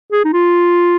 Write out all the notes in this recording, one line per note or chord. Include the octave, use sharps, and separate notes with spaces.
G#4
D#4
F4